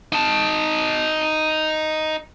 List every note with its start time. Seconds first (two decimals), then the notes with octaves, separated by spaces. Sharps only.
0.13 D#4 A5